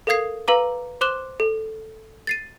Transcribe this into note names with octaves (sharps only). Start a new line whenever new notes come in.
A4 A#4 F5 D#6 G#6 C7
B4 F5 A#5 D6
C5 C6 D6 F#6 E7 G7
A4
A6 C7 D#7